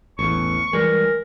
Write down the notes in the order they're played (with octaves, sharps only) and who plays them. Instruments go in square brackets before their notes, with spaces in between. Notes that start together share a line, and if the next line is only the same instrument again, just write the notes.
[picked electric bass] A1 E2 [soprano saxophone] C#6
[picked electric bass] E3 G3 G#3 [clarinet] A#4